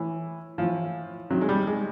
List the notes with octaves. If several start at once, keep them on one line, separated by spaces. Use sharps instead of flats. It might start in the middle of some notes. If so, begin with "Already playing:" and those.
Already playing: A2 E3
A2 E3 F3
C3 D#3 F#3
G#3
G3
G#3